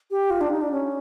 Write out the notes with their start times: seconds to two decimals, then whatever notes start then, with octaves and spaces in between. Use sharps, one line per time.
0.11 G4
0.30 F4
0.41 D4
0.51 D#4
0.61 D4
0.71 C#4